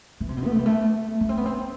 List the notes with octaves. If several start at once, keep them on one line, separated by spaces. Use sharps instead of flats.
E3
C3
B2
B3
A3
G3
A3
B3
C4
B3
C4